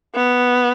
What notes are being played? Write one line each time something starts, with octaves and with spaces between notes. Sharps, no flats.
B3